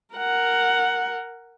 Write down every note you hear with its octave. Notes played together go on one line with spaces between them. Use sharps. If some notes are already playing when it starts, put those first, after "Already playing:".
A#4 F#5